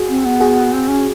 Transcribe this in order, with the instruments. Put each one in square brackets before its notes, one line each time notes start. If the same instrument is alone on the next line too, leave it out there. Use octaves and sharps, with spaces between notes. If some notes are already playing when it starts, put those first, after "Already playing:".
Already playing: [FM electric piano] F#4 G#4
[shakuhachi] C4
B3
[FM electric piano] F#4 G#4
[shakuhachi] C4
C#4